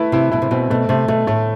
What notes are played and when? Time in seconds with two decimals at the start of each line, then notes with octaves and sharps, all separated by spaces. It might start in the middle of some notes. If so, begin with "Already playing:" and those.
Already playing: A3 E4 B4
0.12 C3 E4
0.32 B2 E4
0.42 C3
0.51 B2 C4
0.70 B2 A3
0.89 C3 A3
1.08 B2 A3
1.27 A2 A3